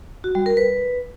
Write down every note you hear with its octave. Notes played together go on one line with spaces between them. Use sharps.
F#4
G3
A#4
B4